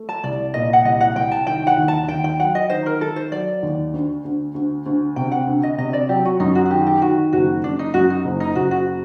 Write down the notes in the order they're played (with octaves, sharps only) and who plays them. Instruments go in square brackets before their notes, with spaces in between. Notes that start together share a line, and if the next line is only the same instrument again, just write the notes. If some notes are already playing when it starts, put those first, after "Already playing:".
Already playing: [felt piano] A3
[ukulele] A5
[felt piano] C2 [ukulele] D5
[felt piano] A#2 [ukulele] D#5
[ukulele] F#5
[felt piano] C2 [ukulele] D#5
[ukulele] F#5
[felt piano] C2 [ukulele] G5
[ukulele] A5
[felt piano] D#3 [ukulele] G5
[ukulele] F#5
[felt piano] D#2
[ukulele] A5
[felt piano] D#2 [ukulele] G5
[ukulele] G5
[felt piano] F#3 [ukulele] F#5
[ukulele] D#5
[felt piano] D#3 [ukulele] C5
[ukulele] A#4
[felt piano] D#3 [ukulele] A4
[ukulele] C5
[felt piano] F#3 [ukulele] D5
[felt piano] D#2
D2
D2
D2
D2
[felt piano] C3 [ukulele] G5
[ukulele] F#5
[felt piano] D2
[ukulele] D#5
[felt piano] C3 [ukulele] D#5
[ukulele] D5
[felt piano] F#3 [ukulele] G4
[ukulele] F#4
[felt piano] F#2 [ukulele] D#4
[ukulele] F#4
F#4
[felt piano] D#3 [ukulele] G4
[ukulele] G4
[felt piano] D#3 [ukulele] F#4
[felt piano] F#1 [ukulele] F#4
[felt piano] F#2 [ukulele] D4
[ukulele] D#4
[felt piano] F#2 [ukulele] F#4
[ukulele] D#4
[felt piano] F#1
[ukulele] D#4
[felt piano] F#1 [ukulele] F#4
[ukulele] F#4